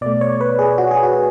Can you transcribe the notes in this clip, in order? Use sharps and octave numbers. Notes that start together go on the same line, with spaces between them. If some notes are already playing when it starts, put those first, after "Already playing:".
B2 A3 D5
C#5
B4
G#4
F#4
G#4
F#4